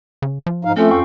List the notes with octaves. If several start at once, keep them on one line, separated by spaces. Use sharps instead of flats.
C#3
F3
G#2 D#4 F5
A3 C4 C#4 F4 A4
F2 F5 G5 C#6